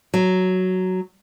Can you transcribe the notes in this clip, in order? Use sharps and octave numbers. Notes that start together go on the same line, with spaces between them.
F#3